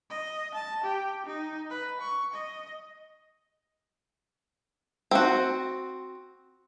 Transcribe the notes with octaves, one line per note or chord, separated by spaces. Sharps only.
D#5
A5
G4
D#4
B4
C#6
D#5
C4 F#4